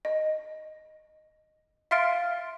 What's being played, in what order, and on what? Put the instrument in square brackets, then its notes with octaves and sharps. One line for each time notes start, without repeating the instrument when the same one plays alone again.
[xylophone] D#5
E5 F5 C6 F6 A6 D7